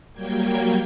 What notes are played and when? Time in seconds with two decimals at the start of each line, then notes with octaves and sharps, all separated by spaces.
0.13 F#3 G3 A#3 G5 G#6